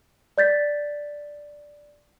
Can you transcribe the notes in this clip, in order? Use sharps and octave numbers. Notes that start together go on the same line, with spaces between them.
D5 G6 A6 B6